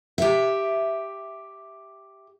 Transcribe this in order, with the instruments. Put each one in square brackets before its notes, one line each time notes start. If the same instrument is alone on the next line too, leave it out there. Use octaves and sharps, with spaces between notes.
[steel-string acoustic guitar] G4 E5